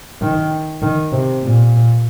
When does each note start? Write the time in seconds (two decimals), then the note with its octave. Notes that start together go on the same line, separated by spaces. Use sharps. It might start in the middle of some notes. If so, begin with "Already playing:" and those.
0.22 D#3
0.82 D#3
1.12 C3
1.43 A#2